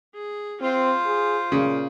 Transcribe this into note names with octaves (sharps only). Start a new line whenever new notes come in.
G#4
C4 F4 C5
G#4
A#2 C#3